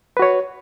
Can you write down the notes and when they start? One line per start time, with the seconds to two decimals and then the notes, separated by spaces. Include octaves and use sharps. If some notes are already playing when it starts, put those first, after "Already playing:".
0.17 B4
0.19 F#4
0.22 C#5